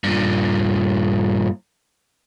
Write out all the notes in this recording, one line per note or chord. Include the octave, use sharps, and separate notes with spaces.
G2 A#2